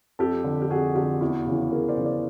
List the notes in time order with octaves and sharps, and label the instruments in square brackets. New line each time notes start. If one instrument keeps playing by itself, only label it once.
[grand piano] F2 G4 A4
D3
G4
F2 F#4 G#4
D3 F4 G4
E2 E4 F#4
C#3 E3
E2 G#4 A#4
C5 D5
C#3 E3
C5 D5